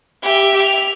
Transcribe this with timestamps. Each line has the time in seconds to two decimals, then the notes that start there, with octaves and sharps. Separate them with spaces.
0.23 G4 E5
0.63 F7